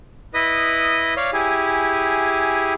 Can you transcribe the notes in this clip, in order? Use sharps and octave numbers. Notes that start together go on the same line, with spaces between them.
E4 B4 D#5 D#6
C#5 D5 F5
E4 G4 G#4 G#5